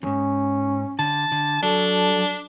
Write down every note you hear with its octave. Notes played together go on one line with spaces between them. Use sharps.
E2 G#2 C#4
D3 A5
D3
F#3 D4 A4